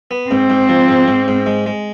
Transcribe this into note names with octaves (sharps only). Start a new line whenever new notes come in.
B3
G#2 C4
G#2
F3
G#2
G#2
G#2
G#3
G#3